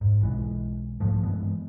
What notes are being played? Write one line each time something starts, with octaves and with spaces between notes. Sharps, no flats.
G#2
B1 E3 G#3
G#2 E3 F3 A3
G2 E3 G#3 B3